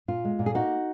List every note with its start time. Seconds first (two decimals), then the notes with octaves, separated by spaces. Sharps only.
0.08 A#2 F4
0.24 G#3
0.39 A#2
0.46 G#4
0.54 A#3 D#4 F#4